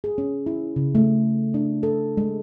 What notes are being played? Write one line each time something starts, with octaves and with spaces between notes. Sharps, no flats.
G#4
C#4
E4
C#3
A3
D4
A4
G#3